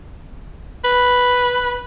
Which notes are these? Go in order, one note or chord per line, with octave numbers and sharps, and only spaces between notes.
B4